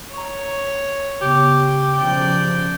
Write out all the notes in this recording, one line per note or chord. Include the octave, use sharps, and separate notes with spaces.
C#5 A#5 C#6
C#3 B3 G4
C#3 F3 D5 G5 G6